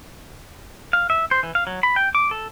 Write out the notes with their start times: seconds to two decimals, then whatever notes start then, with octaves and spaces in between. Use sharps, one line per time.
0.93 F5
1.10 E5
1.31 C5
1.43 E3
1.55 F5
1.67 F#3
1.83 B5
1.96 G5
2.15 D6
2.31 A4